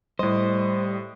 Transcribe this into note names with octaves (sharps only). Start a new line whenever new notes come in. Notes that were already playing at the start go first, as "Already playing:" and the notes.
A2 G3 C5 D#5